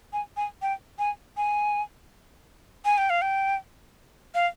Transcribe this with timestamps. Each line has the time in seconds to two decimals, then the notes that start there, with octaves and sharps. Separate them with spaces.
0.13 G#5
0.37 G#5
0.62 G5
0.99 G#5
1.37 G#5
2.85 G#5
2.98 G5
3.10 F5
3.22 G5
4.34 F5